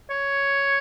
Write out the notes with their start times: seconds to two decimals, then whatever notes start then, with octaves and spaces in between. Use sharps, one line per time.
0.10 C#5